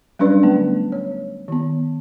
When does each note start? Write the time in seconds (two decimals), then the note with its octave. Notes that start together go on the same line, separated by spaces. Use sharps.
0.19 F#3 G3 C#4 D4 B4 D5
0.43 D3 A3 B3
0.92 C#5
1.48 D#3 B3